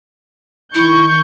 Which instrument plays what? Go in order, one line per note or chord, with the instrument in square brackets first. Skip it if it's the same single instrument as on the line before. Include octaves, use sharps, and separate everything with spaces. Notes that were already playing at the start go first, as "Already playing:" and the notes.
[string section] D#3 C#6 G6 [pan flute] E4